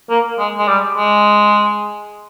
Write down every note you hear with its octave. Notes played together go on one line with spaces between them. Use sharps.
A#3
G#3
G#3
G3
G#3